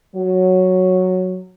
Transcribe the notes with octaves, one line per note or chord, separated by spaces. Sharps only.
F#3